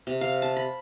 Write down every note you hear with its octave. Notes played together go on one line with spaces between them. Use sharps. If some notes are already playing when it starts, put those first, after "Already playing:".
C3
F5
A5
B5